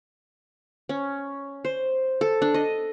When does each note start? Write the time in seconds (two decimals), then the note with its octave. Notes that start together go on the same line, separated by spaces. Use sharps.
0.89 C#4
1.65 C5
2.21 A4
2.42 D4
2.54 D#5